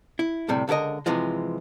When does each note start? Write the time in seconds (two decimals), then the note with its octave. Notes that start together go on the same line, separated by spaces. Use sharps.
0.19 E4
0.48 D2 A2 C3 G3
0.68 C#2 D3 A4 A#4 D#5
1.06 C3 E3 F3 G#3